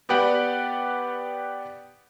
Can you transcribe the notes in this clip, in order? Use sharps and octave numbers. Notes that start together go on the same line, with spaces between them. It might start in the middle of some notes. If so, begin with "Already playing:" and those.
B3 G4 B4 D5 F#5 G5